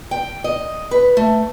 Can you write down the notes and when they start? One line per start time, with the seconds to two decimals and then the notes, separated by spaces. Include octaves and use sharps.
0.11 G5
0.44 D#5
0.91 B4
1.17 A3